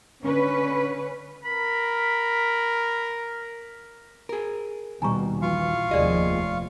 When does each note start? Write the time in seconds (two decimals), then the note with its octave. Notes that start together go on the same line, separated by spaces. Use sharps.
0.22 D3 C#4 B4
1.44 A#4 B5
4.29 G#4 A#4
5.02 D#2 B2 G3 G#5 A#5 C#6
5.42 A#1 E3 F4 F#4 F5 C#6
5.91 F1 D#2 F3 G4 G#4 D5 D#5